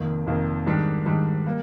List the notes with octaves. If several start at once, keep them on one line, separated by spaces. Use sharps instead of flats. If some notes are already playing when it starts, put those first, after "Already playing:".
Already playing: F1 F2 D#3 A#3
F1 F2 D#3 A#3
G#2 D#3 G3 D4
G#2 D#3 G3 D4
G3 A#3